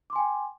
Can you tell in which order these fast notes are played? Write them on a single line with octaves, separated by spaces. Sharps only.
D6 C6 G#5 G5